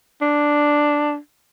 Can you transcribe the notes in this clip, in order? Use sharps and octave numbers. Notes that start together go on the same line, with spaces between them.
D4